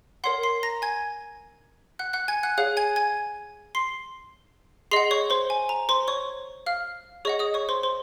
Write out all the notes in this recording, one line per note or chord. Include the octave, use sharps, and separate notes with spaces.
A#4 C#5 F#5 C6 C7
C6 C7
A#5 A#6
G#5 G#6
F#5 F#6
F#5 F#6
G#5 G#6
F#5 F#6
G#4 C#5 F5 F#5 F#6
G#5 G#6
G#5 G#6
C6 C7
G#4 D#5 F#5 C6 C7
C#5 C#6
C5 C6
G#5
A#5
C5 C6
C#5 C#6
F5 F6
G#4 C#5 D#5 F#5 C#6
D#5 D#6
C#5 C#6
C5 C6
C5 C6